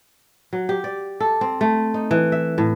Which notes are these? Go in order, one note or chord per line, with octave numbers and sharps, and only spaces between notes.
F#3
G4
D5
A4
C4
A3
D#4
E3
E5
A2